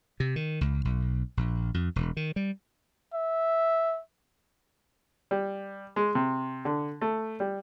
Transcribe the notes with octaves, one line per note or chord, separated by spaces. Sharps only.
C3
D#3
C#2
B1
A#1
F2
E1
D#3
G3
E5
G3
G#3
C3
D3
A3
G3